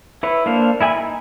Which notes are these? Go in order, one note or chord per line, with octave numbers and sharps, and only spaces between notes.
E4 B4 C#5
A#3 D4 C5 F5
E4 G#4 G#5 B5
D#4